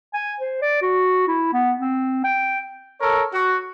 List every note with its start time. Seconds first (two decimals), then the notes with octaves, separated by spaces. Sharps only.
0.14 G#5
0.40 C5
0.62 D5
0.82 F#4
1.28 E4
1.53 B3
1.79 C4
2.24 G5
3.01 A4 A#4 C#5
3.33 F#4